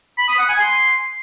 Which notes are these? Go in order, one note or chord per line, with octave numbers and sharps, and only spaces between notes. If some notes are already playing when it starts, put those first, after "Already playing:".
B5
D#6
F#5
G#5
C6